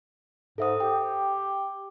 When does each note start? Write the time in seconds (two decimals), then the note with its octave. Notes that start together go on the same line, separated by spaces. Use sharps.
0.58 G#2 A4 E5 D#6
0.80 G4 G5